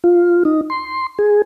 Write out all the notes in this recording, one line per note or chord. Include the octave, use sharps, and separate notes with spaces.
F4
D#4
C6
G#4